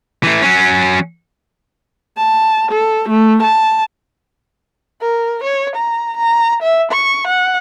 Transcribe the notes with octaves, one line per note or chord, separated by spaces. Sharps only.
E3 A3
F#3 C#4
A5
A4
A3
A5
A#4
C#5
A#5
A#5
E5
C#6
F#5